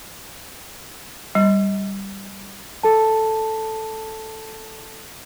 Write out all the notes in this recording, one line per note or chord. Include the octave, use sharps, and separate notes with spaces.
G3
A4 A5